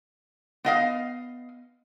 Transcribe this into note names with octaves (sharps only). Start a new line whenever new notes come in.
B3 D#5 F5